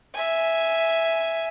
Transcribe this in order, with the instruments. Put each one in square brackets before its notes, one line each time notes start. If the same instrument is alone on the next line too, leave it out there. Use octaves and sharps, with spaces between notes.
[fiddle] E5 G#5